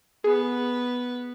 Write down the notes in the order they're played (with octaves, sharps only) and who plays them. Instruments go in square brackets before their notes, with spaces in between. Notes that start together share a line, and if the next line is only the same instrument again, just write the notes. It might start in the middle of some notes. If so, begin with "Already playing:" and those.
[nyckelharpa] B3 B4 [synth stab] G#4